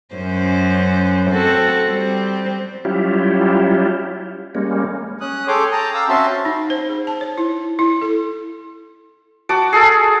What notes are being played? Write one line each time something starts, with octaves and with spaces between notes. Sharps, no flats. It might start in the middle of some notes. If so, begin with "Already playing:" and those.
F#2 C#4 C5
C4 F#4 A4
G3 C4
F#3 G3 C#4 E4 F4 G4
G3 G#3 A#3 C#4
C#4 D#6 F#6
G#4 A4 C#5 G5 C6 D6
G5 A5 A#5 D#6
F5 G5 D6 E6
C4 C#4 F#4 E5 A5 C6
D#4
C5
G#4
A5
C#5
E4
E4
A4
F#4 A5 D6
G#4 A4